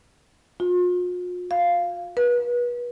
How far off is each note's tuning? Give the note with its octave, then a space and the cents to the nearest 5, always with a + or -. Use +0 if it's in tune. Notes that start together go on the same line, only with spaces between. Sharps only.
F4 +45
F5 -5
B4 -30